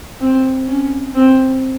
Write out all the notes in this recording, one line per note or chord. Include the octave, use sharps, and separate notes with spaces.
C4
C#4
C4